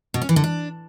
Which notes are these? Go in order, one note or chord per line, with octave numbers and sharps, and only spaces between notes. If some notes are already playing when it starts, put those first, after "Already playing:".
B2
C#4
E3
D3
D4